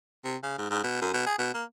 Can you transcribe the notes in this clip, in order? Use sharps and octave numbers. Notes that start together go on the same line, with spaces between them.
C3
C#3
G#2
G#2
B2
F#2
B2
G#4
B2
A#3